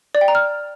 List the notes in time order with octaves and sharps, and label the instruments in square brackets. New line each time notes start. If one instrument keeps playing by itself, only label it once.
[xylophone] D5
G5
A#5
F6